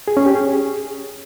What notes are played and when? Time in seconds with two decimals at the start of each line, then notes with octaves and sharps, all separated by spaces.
0.08 G#4
0.17 C#4
0.26 G4
0.35 G#4